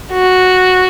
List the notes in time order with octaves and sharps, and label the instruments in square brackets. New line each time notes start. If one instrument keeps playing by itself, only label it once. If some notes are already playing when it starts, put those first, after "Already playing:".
[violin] F#4